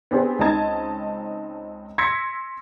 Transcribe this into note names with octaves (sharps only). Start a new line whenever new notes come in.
B3 C4 D4 G4 G#4 C5
C#2 C4 D#4 D#5 A5 G#6
C6 E6 G#6 A#6 B6 C#7